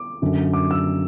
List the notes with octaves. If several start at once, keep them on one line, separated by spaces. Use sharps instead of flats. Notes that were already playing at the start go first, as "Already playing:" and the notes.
Already playing: D6
F#2 D3
D6
E6